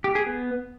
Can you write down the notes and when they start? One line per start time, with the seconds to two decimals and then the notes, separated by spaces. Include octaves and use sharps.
0.04 G4
0.15 G#4
0.26 B3